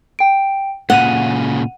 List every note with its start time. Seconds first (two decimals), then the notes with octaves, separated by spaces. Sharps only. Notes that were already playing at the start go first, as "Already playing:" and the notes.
0.19 G5 D7
0.90 A#2 C#3 F#5 D#7 F7 G7